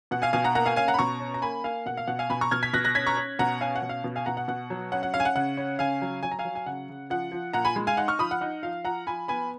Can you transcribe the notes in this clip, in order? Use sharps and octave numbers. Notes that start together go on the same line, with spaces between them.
B2 F#5
F5 G#5
B2 F5 G#5
F#5 A#5
A#3 F#5 A#5
F5 G#5
C#4 F5 G#5
F#5 A#5
B5
B2 A#5 C#6
C#4
A#5
A#3 G#5 B5
A#3 F5 G#5
B2 F#5
F5
B2 F#5
F5 G#5
B2 G#5 B5
A#5 C#6
B2 F6 G#6
G#6 B6
B2 F#6 A#6
F#6 A#6
C#4 G#6 B6
A#5 C#6
C#4
B2 F#5 A#5
C#4 F5 G#5
F#5
B2
F5
B2
F5 G#5
B2 F#5 A#5
F#5
B2 F#5
F#3
C#4 F#5
F#5
C#4 F5
G#5
F#5
C#3 F#5
C#4
C#3 F5 G#5
F#3
F#3 G#5
A#5
F5 G#5
F#3
G#5
C#3 F#5
C#3
F3 F#5
F3
A#2 F#5 A#5
G#5 B5
G#3
F5 G#5
D#4 F#5
C#6 F6
F3 B5 D#6
F#5
D#4 F#5
F3 F5
F3 F#5 A#5
F3 G#5 B5
B3 G#5 B5